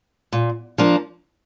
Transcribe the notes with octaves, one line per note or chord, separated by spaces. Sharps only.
A#2
F3 A#3 D4